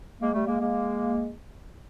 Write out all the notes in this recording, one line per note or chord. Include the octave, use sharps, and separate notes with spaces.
G#3 A#3
G3 A3
G#3 A#3
G#3 A#3